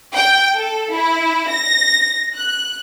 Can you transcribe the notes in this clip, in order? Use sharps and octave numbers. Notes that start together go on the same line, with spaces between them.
G5
A4
E4
A#6
F#6